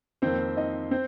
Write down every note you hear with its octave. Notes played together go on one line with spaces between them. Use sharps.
F2 D#3 A#3 C4 C5
D#4 D#5
C4 C5